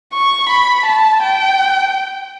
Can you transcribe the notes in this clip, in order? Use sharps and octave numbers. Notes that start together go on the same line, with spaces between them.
C#6
B5
A5
G5